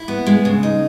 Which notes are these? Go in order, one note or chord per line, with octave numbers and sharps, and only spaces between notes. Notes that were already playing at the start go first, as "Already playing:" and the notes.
Already playing: E4
B3
G#3
C#3
D#4